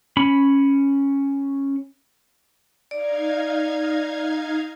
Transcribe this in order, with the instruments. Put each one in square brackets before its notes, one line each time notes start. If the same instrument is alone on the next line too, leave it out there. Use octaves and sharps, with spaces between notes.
[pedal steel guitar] C#4 B5
[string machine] D#4 F5 G#6 [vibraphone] D5